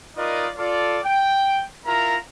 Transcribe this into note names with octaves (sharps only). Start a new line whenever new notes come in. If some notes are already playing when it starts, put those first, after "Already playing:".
D#4 F4 A#4 B4 D5 D#5
F4 A4 D5
G5
E4 F4 A#4 A#5